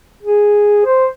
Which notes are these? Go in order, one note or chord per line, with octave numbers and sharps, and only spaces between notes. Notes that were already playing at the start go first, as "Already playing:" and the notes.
G#4
C5